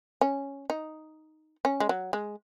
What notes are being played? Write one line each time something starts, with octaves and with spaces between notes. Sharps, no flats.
C#4
D#4
C#4
G#3
F#3
G#3